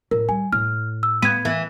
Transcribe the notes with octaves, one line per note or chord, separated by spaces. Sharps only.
A2 A#4
G3 G#5
A2 F6
E6
B3 G#6 D#7
E3